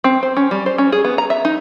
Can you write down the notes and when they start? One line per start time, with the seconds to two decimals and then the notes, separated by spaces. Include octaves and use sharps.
0.04 C4
0.23 C5
0.37 C#4
0.51 G3
0.66 C5
0.78 C#4
0.92 G#4
1.05 B3
1.18 A#5
1.30 E5
1.45 D#4